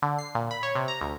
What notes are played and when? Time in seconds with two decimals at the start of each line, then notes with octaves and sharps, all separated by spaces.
0.02 D3
0.19 C7
0.35 A#2
0.51 B5
0.63 C#5
0.75 C3
0.88 A#5
1.01 D2